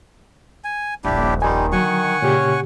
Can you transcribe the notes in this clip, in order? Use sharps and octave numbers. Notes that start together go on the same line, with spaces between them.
G#5
D#1 A#1 D4 E4 G4
D#3 G3 D#4 G#5 C6
D3 F#3 F#5 G#5 C#6
A#2 C#3 C#4 G4